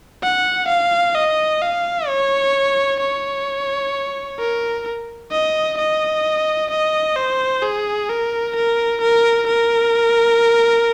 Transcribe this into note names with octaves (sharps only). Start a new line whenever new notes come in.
F#5
F5
D#5
F5
C#5
C#5
A#4
D#5
D#5
D#5
C5
G#4
A#4
A#4
A#4
A#4